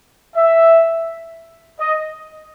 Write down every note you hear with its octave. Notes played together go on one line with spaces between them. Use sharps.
E5
D#5